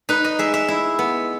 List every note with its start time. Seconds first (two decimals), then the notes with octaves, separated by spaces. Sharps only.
0.09 D#4 B4
0.24 D#5
0.39 G#3 E5
0.54 E5
0.68 E4
0.99 B3